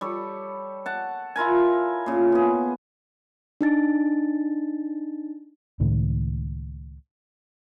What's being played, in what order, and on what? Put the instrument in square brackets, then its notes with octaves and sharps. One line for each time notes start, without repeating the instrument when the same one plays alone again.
[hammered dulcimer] G3 A4 C#5
F#5 A5
E4 F4 A#4 G#5
A#2 C#3
B3 G#4
[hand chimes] D4 D#4 A6
[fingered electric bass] C#2 A2 D#3 A3